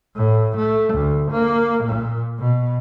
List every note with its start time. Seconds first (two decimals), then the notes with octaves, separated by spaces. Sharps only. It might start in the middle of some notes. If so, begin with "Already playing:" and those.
0.15 A2
0.56 A3
0.94 D2
1.31 A#3
1.84 A#2
2.39 B2